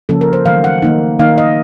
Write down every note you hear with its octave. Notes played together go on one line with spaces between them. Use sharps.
C#3 F3 A#3 C#4 A4
A#4
C5
D#3 F#3 A3 F5
F#5
D#3 A#3 D#4
D#3 A#3 D#4 F5
D#5